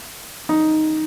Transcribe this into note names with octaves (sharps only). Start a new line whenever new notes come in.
D#4